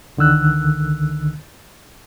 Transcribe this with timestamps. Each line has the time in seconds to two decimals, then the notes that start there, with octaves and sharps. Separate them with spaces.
0.17 C#2 D3 D#3 E6 F#6